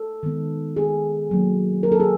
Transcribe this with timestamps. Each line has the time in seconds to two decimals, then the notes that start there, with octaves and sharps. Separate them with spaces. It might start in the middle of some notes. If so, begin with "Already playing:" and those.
Already playing: A4
0.23 D#3 G#3 B3
0.77 G#4
1.30 B2 F#3 A#3
1.83 A#4
1.92 A4
2.00 G#4